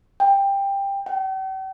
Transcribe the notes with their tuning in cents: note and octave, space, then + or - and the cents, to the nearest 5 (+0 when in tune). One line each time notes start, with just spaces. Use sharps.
G5 +15
G5 -45